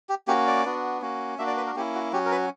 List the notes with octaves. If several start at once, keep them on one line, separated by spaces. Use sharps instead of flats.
G4
A#3 C#4 F#4 G4
D5
B3 D4 F#4
A#3 C#4 F#4
A#3 D4 F#4 E5
D5
B4
A#4
A#3 C#4 E4 G4
F#4
F#3 C#4 F#4 G4
A#4
B4